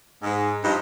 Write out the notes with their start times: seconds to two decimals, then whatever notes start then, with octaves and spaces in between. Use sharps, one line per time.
0.23 G#2 G#3
0.63 G2 F3 D#4